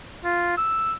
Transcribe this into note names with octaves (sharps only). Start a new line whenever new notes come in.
F4
E6